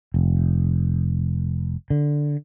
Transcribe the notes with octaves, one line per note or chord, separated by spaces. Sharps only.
F1
D3